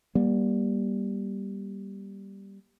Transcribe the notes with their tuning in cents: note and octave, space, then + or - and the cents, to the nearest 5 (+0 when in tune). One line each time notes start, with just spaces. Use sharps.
G3 +0 A#3 +40